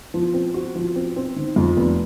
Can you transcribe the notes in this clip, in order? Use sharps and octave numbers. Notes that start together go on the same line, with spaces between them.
F3
C4
F#4
F3
C4
C4
D#3
F2
F1